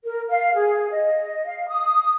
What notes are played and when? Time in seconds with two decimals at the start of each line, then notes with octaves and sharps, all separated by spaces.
0.05 A#4
0.30 F5
0.54 G#4
0.91 D#5
1.45 F5
1.68 D#6